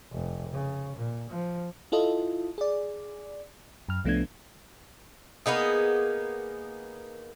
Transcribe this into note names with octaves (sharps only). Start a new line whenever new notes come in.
F1
C#3
A#2
F3
E4 F4 A4 D#5
G#4 D5
F#2 F6
C2 F3 A3 B3 D4 G#6
A#3 B3 D#4 G#4